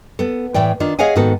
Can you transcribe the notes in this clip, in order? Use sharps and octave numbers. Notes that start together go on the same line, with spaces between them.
B3 A4
A2 E3 D5 G5
D#3 D4 F4
G#4 C#5 D#5 F5 F#5 G#5
G#2 D#3 B3 F#4 A4